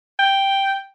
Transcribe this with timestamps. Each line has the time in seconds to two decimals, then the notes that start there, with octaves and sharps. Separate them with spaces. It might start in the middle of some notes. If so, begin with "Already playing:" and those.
0.19 G5